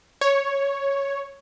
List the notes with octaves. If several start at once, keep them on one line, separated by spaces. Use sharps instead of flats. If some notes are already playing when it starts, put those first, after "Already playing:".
C#5